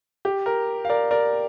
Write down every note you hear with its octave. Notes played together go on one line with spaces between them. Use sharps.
G4
A#4
F5
A#4 D5
A#4 D5